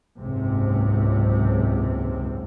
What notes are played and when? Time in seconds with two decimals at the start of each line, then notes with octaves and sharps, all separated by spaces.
0.20 F#1 C#2 G#2 C3